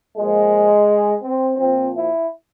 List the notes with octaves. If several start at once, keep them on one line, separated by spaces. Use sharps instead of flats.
A#2 F3 G#3
C4
A#2 F3 C4
E4